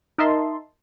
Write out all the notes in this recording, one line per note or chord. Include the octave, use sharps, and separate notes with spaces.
D#4 A#4 D#5 E5 A5 C6